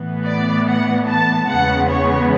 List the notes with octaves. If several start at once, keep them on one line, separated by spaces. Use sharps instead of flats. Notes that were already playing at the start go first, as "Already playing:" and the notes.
Already playing: A2 E3 B3
D5
F#5
A5
E2 C#3 G#3 B3 F#5
C#5